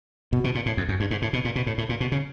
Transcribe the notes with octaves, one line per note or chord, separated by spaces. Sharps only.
B2
B2
A#2
A2
F2
F#2
G2
G#2
A2
B2
A#2
B2
A2
A2
A#2
B2
C#3